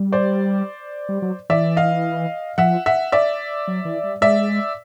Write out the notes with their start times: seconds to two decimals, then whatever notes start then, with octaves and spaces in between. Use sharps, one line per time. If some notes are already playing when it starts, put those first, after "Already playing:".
Already playing: G3
0.12 C5 D5
1.09 G3
1.22 F#3
1.50 E3 D5 E5
1.76 D#5 F5
2.58 F3 E5 F#5
2.86 E5 F#5
3.12 D5 E5
3.68 F#3
3.85 E3
4.03 G3
4.21 G#3 D5 E5